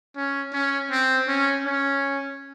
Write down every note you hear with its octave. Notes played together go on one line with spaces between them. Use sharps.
C#4
C#4
C4
C#4
C#4